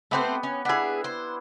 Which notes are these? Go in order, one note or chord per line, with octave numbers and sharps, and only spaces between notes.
A3 B3 C4 G4 B4 C5
C#4
B3 D4 E4 G#4
C5